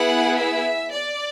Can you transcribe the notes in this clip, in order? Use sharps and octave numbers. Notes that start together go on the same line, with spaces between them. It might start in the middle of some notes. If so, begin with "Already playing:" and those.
Already playing: B3 E4 G#4 F#5
E5
D5